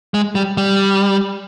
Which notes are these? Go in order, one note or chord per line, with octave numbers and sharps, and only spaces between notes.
G#3
G3
G3